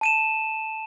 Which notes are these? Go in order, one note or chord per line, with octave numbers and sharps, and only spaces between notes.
A5 D#7 E7